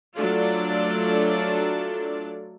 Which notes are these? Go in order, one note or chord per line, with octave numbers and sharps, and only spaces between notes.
F#3 A3 D4 F4 A4 D5